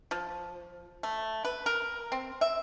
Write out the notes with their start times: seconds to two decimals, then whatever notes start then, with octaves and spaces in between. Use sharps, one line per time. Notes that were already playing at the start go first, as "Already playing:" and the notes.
0.11 F3
1.03 A3
1.45 B4
1.66 A#4
2.12 C4
2.41 E5